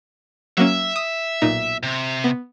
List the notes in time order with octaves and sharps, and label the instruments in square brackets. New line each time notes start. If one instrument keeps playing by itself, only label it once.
[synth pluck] F#3 A#3 C#4 [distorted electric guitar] E5
[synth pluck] D#6
B1 A#2 D#4
[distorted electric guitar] C3
[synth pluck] B3